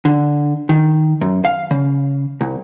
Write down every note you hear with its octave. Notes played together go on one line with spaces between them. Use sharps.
D3
D#3
F#2
F5
C#3
C2